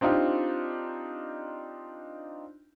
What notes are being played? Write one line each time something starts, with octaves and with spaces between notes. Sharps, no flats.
C4 D4 D#4 F4 G4